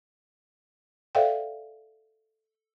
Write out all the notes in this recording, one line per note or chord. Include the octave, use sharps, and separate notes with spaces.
A4 C5 D5 E5 F5 G5